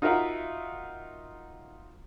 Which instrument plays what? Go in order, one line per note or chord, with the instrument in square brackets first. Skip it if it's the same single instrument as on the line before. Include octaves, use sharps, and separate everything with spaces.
[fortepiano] D#4 F4 F#4 A#4 E5 F#5